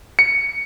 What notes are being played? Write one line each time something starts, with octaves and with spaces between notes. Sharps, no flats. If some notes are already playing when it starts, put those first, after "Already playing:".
C#7